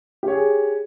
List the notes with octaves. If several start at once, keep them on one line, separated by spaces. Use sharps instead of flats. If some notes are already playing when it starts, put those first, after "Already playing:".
G4 G#4 C#5